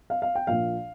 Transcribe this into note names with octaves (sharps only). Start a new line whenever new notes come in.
F5
F5
G5
A#1 A#2 F3 F5